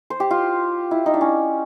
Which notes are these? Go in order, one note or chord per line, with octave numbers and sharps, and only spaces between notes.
C5
G4
F4
E4
D#4
D4
C#4